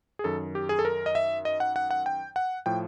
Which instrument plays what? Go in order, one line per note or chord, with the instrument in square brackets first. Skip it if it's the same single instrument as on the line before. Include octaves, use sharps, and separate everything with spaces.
[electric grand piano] G#4
F#2 D#3 A4
G4
G#4
A4
A#4
D#5
E5
D#5
F#5
F#5
F#5
G5
F#5
A2 F3 G5